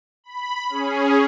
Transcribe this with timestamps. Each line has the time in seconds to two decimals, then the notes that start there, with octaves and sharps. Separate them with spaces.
0.24 B5
0.69 C#4 G#4